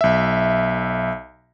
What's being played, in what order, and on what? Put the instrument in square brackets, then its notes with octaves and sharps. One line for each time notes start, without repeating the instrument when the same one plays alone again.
[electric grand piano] B1 E5